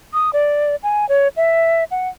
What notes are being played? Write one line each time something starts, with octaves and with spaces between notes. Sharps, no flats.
D#6
D5
G#5
C#5
E5
F#5